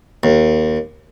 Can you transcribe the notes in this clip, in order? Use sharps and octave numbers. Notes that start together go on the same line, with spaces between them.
D#2